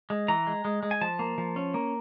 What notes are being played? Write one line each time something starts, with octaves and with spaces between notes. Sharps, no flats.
G#3
E3 A#5
G#3
G#3
G#3
G#5
F3 A5
A#3
F3
C#4
A#3